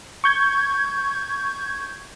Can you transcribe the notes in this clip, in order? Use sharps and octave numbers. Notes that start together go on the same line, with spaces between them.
C#6 G6 G#6